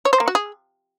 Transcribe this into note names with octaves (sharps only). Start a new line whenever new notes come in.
C#5
C5
A#3
F#4
G#4